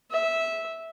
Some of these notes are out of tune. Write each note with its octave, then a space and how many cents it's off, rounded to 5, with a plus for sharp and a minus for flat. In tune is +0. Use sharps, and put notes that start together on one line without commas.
E5 -10